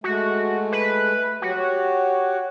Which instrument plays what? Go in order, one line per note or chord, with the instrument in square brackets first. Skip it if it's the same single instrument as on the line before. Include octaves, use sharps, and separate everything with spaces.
[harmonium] G#3 A3 [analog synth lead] F#4
[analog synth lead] B4
[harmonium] F#3 G4 [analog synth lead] F#4
[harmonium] G4 C#5